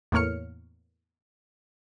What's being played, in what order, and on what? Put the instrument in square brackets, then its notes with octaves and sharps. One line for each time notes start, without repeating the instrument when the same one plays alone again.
[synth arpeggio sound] E2 A2 A#3 C#5 F6 C#7